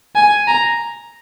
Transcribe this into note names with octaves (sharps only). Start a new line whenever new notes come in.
G#5
A#5